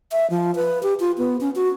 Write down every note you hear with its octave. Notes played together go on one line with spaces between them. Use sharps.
E5
F3
B4
G4
F4
B3
C#4
F#4